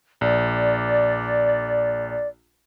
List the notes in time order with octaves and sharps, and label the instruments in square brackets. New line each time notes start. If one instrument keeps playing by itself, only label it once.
[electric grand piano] A#1 [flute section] D5